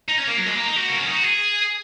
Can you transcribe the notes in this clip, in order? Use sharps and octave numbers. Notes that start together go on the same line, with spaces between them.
D#4
C#4
A#3
F#3
G#3
A#3
D#4
F#4
A#3
C#4
D#4
F#4
G#4